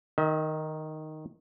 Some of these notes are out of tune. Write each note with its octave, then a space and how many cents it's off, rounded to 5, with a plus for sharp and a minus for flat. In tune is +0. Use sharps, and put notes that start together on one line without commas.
D#3 +0 E5 -45